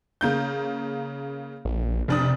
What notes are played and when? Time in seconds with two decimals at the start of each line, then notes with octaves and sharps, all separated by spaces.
0.21 C#3 A#3 G6
1.65 A#1
2.08 F1 C3 D4 D#6